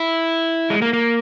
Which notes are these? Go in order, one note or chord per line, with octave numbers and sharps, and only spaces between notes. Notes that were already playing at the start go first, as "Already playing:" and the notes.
Already playing: E4
G#3
A#3
A#3